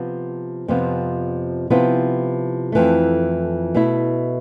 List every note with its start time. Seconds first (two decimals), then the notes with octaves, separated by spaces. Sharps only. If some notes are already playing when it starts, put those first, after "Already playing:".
Already playing: C3 F3 B3
0.68 F2 C3 F3 B3
1.70 C3 F3 B3 E4
2.72 F2 E3 A3
3.75 B2 A3 E4